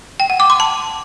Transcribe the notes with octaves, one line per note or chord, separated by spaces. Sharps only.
G5
F#5
D6
C6
A5